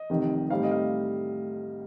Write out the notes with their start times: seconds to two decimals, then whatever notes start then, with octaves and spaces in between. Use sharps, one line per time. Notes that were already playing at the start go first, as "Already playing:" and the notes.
Already playing: D#5
0.10 F1 F2 C3 D#3
0.50 A2 G3 C4 D#4 F5
0.63 D#5
0.71 F5